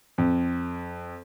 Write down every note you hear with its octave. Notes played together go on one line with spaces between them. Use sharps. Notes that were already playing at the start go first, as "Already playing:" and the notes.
F2